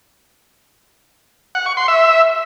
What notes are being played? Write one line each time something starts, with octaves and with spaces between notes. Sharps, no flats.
F#5
C#6
C6
E5